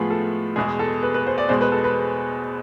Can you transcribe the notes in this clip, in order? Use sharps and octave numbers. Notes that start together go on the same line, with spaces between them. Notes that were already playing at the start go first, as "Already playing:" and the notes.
Already playing: A2 F3 G#3 B3 F4 G#4
A4
E2 B2 G#3 G#4
A4
B4
B4
C5
D5
E2 B2 G#3 C5
B4
A4
B4